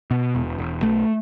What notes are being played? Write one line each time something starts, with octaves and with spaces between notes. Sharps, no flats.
B2
E1
E1
B1 A3